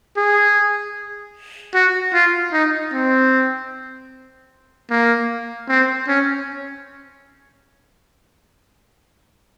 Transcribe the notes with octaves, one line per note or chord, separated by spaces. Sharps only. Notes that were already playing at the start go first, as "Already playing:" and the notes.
G#4
F#4
F4
D#4
C4
A#3
C4
C#4